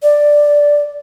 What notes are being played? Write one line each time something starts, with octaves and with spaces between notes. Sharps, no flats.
D5